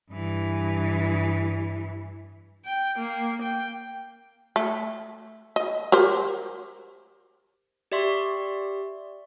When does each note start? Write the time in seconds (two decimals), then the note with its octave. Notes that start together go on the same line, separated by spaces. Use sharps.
0.11 G2 E3
2.65 G5
2.98 A#3
3.41 G5
4.56 A3
5.56 D#5
5.92 G4 A#4 C5
7.92 G4 D5 E5 C6 C#6